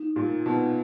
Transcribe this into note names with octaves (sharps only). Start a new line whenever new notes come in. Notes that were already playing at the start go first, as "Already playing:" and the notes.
Already playing: D#4
A#2 G3
B2 D#4